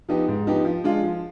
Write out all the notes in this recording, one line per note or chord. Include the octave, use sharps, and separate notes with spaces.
F3 B3 D#4 G4
G#2
F3 B3 D#4 G4
F3
G#3 D4 F4
F3